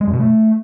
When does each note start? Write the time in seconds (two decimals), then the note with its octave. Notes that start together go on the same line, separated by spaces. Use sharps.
0.01 G#3
0.07 F#2
0.13 B2
0.20 A3